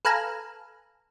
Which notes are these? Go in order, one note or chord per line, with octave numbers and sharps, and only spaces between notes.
A4 B4 F5 G#5 A#5